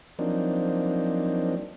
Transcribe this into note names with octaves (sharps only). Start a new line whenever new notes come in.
F3 F#3 A#3 C4 D4 D#4